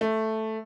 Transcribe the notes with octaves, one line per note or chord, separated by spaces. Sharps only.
A3